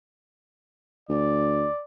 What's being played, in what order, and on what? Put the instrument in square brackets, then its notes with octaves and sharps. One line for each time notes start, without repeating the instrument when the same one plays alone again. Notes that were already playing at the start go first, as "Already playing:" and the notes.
[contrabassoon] D2 [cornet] D5